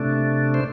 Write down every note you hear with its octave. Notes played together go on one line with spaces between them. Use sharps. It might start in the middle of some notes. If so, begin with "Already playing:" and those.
Already playing: C3 A3 D4
C5